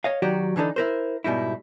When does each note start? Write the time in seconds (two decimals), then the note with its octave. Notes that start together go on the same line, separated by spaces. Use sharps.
0.04 C#5 D#5 F5
0.22 D#3 F#3 F#4 G4 D5
0.56 D3 E3 D4 D#4 A4
0.76 E4 A#4 C5
1.24 G#2 B2 G3 D#4 E4